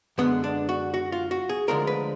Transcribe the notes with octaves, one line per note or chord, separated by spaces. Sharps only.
F#2 D3 G#3 B3
D4
F#4
F#4
F4
F#4
G#4
D2 D3 F3 G#3 A#4
B4